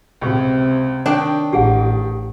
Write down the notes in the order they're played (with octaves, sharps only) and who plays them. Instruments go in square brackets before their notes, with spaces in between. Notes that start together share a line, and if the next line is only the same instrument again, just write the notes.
[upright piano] C#2 [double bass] C3
[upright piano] D#3 G5 [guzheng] D4 [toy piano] C#5
[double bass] A1 [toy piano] G4 G#4 F#5